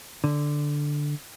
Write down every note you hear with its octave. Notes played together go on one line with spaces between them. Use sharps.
D3